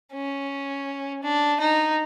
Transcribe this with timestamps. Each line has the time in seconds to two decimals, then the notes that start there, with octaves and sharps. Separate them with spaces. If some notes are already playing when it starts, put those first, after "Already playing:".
0.13 C#4
1.23 D4
1.60 D#4